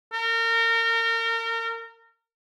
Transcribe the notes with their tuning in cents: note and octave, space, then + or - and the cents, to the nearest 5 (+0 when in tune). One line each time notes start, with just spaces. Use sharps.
A#4 -30